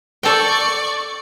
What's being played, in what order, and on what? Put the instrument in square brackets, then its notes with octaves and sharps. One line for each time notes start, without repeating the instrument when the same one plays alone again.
[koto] A4 G5 [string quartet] D5 C#6